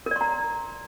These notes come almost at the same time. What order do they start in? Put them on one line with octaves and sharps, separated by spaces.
A#4 D5 C6 A#5